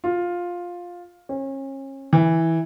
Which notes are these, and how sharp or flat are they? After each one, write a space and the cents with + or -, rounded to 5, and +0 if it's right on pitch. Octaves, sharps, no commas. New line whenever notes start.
F4 +10
C#4 -35
E3 -10